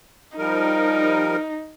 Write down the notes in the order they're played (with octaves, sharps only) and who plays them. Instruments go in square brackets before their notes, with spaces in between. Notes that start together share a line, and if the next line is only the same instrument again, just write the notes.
[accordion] F3 G3 A#4 [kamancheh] D#4